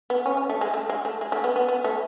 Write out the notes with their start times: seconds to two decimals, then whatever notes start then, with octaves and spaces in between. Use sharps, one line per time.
0.10 B3
0.26 C#4
0.37 C#4
0.49 A3
0.61 G#3
0.74 A3
0.89 G#3
1.05 A3
1.21 G#3
1.32 A3
1.44 B3
1.56 B3
1.68 B3
1.84 A3